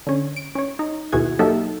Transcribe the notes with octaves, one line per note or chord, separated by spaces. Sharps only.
D3 C#4
D7
C#4 C#5
D#4
D#2 B2 E4 F#4 G#4 G#6
F#3 A#3 D#4 G4 A4 E5